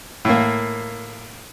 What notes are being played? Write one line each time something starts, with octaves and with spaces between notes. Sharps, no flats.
A2 A#3